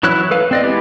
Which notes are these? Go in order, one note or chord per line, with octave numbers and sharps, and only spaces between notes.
E3 F#3 E4 C#5 F#6
A4 B4 F5
C4 D5 D#5
G#3 B3 E4 G4